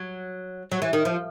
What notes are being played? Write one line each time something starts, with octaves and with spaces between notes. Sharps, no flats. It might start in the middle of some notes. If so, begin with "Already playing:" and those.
Already playing: F#3
F#3
E3
D#3
F3